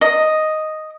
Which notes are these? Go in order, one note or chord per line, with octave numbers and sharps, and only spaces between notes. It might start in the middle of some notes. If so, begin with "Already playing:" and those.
D#5